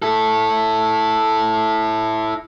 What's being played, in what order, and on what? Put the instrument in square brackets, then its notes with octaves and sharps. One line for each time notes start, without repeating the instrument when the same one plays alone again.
[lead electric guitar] E4 A4